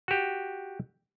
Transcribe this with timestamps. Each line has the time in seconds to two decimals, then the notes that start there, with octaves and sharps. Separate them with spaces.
0.08 F#4 G4